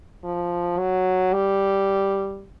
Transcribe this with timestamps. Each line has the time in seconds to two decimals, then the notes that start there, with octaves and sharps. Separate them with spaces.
0.24 F3
0.78 F#3
1.33 G3